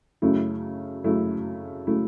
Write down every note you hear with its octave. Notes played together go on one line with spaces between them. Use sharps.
F#2 C#3 F#3 A3 E4
F#2 C#3 F#3 A3 E4
C#3 F#3 A3 E4